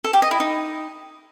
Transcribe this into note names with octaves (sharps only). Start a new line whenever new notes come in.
A4
G4
D#5
E4
D#4